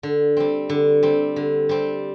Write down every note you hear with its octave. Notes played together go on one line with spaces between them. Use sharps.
D3
G3 C4
D3
G3 C4
D3
G3 C4